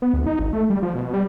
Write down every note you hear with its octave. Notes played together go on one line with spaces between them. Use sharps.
B3
D2
D#4
G#1
A3
G3
F3
B2
G3